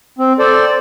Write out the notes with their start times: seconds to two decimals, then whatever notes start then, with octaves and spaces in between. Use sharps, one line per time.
0.19 C4
0.39 A4 C5 D5